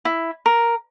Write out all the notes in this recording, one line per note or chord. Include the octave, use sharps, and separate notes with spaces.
E4
A#4